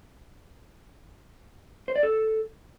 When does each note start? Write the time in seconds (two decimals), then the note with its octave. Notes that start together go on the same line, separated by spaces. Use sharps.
1.88 C5
1.96 D5
2.03 A4